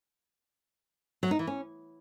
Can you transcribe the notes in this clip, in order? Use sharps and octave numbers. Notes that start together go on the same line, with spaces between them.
F#3
D#4
E3
C#4